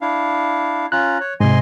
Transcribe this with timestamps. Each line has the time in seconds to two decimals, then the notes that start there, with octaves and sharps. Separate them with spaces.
0.01 D4 E4 F5
0.92 C#4 F4 A#5 F#6
1.20 C#5
1.40 G#2 C3 D#5 G#5 C6